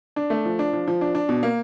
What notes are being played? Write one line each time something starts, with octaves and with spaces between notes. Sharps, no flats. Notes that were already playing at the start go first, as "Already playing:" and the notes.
D4
A3
F3
D4
F3
F3
D4
D4
B2
A#3